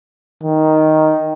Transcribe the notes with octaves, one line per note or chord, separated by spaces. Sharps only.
D#3